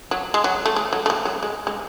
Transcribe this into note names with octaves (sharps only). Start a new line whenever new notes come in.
F#3
G#3
F#3
A3
G#3
F#3
A3
G#3
F#3
G#3
G#3